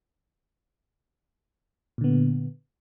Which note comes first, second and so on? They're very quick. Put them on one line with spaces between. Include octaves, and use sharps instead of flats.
A#2 D3 B3